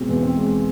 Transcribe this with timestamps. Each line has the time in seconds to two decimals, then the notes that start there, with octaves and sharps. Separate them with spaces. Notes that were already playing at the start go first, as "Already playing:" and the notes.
Already playing: B2 G#3 C4
0.09 E2
0.23 C4
0.37 G#3